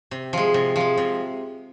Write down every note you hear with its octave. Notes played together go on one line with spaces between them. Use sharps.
C3
F3 G#3
C3
F3 G#3
C3